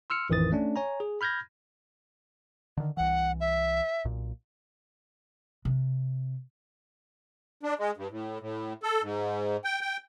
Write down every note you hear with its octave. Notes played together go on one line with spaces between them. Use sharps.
C6 E6 F6 C#7
A1 F2 D#3 E3 D#6 A6
A3 C#4 D4
C#5 G#5 A#5
G#4
B5 F6 G6 G#6 A#6
D3 D#3
C2 E3 F#5
E5
B1 A#2
C3
D4
G#3
G2
A2
A2
A4
G#2
G5
G5